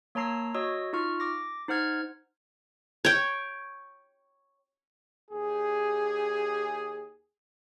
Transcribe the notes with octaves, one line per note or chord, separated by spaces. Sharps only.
A#3 C#5 A5 A#5 E6 C7
F#4 C#5 D#5 D#6 E6
D#4 F4 C#6 F6
D6 A#6
D#4 C5 F#5 F6 G#6
C#5 G5
D#2 G4 G#4